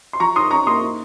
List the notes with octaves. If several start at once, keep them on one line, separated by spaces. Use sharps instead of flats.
C6
F3 A#5 C#6
D#4 C6 D#6
C#4 A#5 C#6
A#3 C6 D#6
D#4